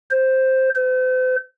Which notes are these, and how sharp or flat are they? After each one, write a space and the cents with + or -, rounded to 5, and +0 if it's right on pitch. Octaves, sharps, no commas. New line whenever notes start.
C5 +5
C5 -40